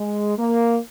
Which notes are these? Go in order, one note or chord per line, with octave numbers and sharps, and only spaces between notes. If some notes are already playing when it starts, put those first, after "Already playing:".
Already playing: G#3
A#3